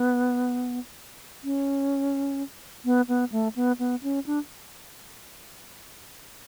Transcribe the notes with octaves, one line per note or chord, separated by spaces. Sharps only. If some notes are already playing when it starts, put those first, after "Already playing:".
Already playing: B3
C#4
B3
B3
A3
B3
B3
C#4
D4